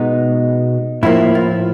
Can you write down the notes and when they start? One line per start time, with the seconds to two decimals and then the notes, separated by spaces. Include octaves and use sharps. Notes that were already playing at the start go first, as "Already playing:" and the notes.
Already playing: B2 G#3 B3 D#4
1.03 A2 F3 A#3 E4
1.35 F4